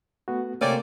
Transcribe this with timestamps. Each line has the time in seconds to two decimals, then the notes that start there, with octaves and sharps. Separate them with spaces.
0.28 A3 B3 F#4
0.61 C3 A3 A#3 C4 C#4 D5